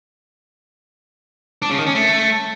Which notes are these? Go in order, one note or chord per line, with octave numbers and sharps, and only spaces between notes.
D4
C#3
D#3
C#4
A3